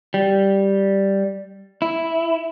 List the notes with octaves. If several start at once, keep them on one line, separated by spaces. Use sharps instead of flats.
G3
E4